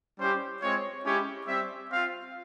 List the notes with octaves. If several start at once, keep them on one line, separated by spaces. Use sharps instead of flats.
G3 C#4 E4 G4 C5
G#3 C4 F4 C#5
G#3 C#4 E4 G4 C#5
G3 C4 G4 E5
C4 F4 F5